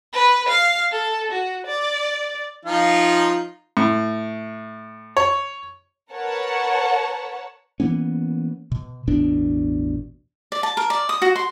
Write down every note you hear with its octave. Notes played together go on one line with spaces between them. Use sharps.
B4
F5
A4
F#4
D5
F3 D#4 F4
A2
C#5
A#4 B4 C#5 F#5 A5
E3 A#3 B3 C#4
B2
A1 E2 B2 D4
D5
A5
A#4
D5
D#6
F#4
C6